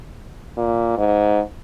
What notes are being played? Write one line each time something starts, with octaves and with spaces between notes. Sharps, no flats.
A#2
G#2